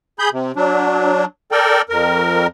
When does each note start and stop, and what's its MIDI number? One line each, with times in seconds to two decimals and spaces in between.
0.19 0.30 68
0.19 0.30 83
0.19 0.30 91
0.33 0.52 48
0.56 1.25 54
0.56 1.25 62
1.52 1.82 69
1.52 1.82 70
1.52 1.82 74
1.52 1.82 79
1.89 2.47 41
1.89 2.47 70